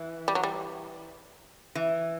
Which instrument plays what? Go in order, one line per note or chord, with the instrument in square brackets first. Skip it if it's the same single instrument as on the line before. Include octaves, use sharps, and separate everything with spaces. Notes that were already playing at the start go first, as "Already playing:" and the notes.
Already playing: [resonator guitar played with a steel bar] E3
[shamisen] G3
F#3
G3
[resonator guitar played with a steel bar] E3